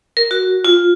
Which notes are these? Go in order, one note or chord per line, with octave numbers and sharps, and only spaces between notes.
A#4
F#4
F4